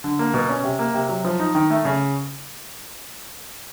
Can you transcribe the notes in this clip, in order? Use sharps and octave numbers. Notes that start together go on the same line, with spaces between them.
D3
A#3
B2
C#4
C3
A#3
C3
F#3
F3
D#4
D#3
A3
C#3